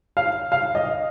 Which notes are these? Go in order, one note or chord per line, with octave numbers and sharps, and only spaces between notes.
F5
F5
D#5